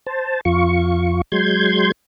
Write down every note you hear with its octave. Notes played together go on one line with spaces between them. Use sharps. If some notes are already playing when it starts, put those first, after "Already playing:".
C5 A5
F2 F4 C#6
F#3 G#3 C6 G6 G#6